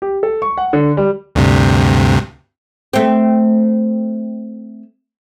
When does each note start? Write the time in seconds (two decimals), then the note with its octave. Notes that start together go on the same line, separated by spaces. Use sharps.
0.02 G4
0.23 A4
0.42 C#6
0.58 F#5
0.73 D3
0.97 G3
1.35 D2 G2 C3
2.93 A3 C4